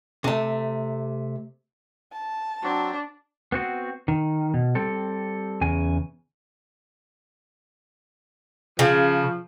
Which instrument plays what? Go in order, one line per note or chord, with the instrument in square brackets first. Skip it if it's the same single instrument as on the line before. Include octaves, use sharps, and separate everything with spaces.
[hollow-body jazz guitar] C3 A3
[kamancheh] A5
[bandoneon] F#3 C4 F#4 [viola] D4
[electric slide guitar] B3 C4 F#4
D#3
B2
G3 C4 A4
E2 C#3 G#5
[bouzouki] C#3 [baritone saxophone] F3